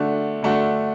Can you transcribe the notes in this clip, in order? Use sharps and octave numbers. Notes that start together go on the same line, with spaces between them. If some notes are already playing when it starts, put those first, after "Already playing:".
Already playing: D3 A3 D4 F#4
D3 A3 D4 F#4